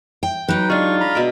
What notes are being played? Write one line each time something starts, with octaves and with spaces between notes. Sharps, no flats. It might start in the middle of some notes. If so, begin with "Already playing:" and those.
G5
F#3 D#4 B4 G5
G#3 D4 F4 C#6
A#5 B5
B2 E5 D6